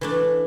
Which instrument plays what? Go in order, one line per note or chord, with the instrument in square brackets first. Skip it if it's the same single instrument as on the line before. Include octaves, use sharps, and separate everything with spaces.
[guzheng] E3 A3 D4